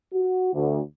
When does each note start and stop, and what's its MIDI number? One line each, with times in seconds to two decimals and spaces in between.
0.14 0.50 66
0.54 0.80 38